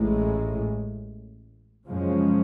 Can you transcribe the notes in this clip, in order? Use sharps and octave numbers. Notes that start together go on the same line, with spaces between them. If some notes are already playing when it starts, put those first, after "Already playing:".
Already playing: A1 A2 G#3
F#2 C#3 F3 G#3 C#4